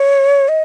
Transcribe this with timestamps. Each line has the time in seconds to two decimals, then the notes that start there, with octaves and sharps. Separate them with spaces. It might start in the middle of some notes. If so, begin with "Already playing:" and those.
Already playing: C#5
0.48 D#5